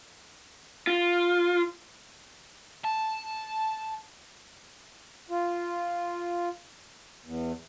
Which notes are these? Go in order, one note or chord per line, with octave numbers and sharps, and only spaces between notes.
F4
A5
F4
E2